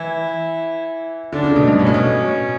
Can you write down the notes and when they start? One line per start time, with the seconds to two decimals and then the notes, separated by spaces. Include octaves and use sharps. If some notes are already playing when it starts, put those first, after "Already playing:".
Already playing: E3 E4
1.32 D3 D4
1.44 C#3
1.56 B2
1.67 G2
1.79 B2 C#4
1.86 A2
1.94 B2